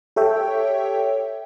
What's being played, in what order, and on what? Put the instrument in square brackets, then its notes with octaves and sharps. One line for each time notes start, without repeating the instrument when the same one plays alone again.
[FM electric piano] G4 A4 C#5 E5 G5